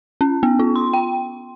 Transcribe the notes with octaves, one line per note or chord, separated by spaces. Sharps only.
C#4
B3
F4
C6
G5